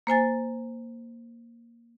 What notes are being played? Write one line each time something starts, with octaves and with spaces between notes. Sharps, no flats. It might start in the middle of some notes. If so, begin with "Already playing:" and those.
A#3 C5 G#5 A6